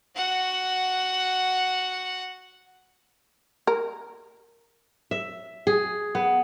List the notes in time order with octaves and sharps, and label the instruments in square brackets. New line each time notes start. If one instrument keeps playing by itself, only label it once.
[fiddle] F#4 F#5
[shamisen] A#4
[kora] E5
G#4
B3